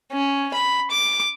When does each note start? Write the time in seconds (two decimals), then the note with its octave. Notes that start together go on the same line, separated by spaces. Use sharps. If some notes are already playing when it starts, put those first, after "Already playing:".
0.12 C#4
0.54 B5
0.91 D6